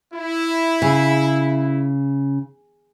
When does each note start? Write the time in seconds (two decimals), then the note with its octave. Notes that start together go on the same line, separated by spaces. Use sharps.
0.14 E4
0.82 C#3